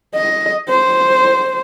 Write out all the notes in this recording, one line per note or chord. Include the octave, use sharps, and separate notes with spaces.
D#5
C5